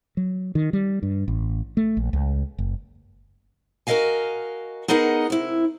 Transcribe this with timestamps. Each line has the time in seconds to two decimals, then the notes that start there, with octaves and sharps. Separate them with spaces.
0.17 F#3
0.55 D#3
0.73 G3
1.03 G2
1.28 A1
1.77 A3
1.97 A#1
2.13 C#2
2.58 F#1
3.87 F#4 A#4 B4 D#5 F5 G#5
4.88 B3 D#4 G#4 A#4 D#5 F#5
5.30 C3 E4